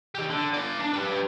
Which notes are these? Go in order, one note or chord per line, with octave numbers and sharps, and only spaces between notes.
D#3 G4
D3
D5 A#5
D4
G4 B4